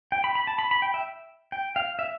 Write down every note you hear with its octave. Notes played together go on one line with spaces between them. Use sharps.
G5
B5
B5
A5
B5
B5
G5
E5
G5
F5
E5